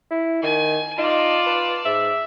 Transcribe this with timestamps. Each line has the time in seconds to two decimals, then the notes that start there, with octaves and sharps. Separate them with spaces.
0.11 E4
0.43 D#3 G#5
0.98 D#4 F4 D5 A5
1.46 B4
1.85 G#2 E5